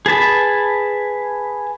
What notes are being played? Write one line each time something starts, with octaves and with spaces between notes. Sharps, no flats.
G#4 B4 A5 B5